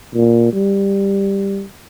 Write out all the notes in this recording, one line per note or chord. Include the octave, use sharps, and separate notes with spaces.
A#2
G3